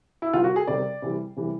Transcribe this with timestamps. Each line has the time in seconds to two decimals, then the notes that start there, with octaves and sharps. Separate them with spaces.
0.22 E4
0.33 C3 D#3 G3 F4
0.44 F#4
0.56 G#4
0.67 C3 D#3 G3 D5
1.02 C3 E3 G3
1.37 C3 E3 G3